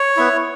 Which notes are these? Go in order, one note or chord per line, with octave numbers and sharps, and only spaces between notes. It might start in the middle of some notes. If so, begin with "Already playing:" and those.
Already playing: C#5
B3 E4